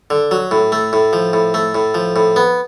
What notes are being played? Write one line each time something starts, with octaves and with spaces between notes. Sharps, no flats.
D3
F#3
A2
A3
A2
F3
A2
A3
A2
F3
A2
B3